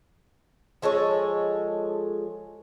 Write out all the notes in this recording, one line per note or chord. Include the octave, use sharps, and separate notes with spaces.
F3 G#3 A4 C#5